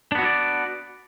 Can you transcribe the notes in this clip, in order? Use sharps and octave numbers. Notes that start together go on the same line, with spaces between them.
B3 D4 E4 F#4 D5